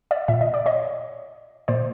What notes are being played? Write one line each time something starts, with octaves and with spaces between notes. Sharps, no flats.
D5 E5
A#2 E5
D#5
D5
C#5 D#5
A#2 C5 D5